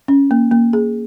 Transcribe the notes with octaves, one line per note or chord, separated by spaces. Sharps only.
C#4
A#3
A#3
G#4